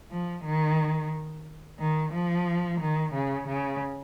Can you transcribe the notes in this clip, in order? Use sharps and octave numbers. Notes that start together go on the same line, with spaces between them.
F3
D#3
D#3
F3
D#3
C#3
C#3